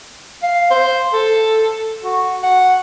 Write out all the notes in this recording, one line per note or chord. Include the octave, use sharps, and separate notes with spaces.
F5
C5
A4
F#4
F#5